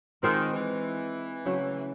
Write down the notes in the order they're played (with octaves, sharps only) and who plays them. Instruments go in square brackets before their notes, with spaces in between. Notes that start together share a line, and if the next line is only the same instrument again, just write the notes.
[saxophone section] D#3 [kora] G#3 C4 F4
[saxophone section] E3
[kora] C#3 F#3 A3